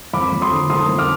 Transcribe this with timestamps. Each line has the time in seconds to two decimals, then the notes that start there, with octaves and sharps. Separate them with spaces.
0.13 F2 B5 D6
0.33 F2
0.42 C6 D#6
0.51 D3
0.70 F2 C6 D#6
0.89 F2
0.98 D6 F6